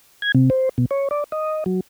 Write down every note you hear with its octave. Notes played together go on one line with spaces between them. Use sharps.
G#6
C3
C5
B2
C#5
D5
D#5
F#3